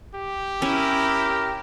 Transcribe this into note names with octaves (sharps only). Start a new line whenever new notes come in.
G4
C#4 E4 A#4